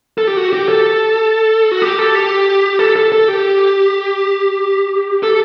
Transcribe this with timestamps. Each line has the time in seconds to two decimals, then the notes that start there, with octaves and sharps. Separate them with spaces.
0.18 A4
0.27 G4
0.37 F#4
0.53 G4
0.69 A4
1.71 F#4
1.82 G4
1.99 A4
2.15 G4
2.79 A4
2.96 A4
3.12 A4
3.28 G4
5.23 A4